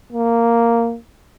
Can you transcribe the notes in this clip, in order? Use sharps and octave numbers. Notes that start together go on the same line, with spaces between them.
A#3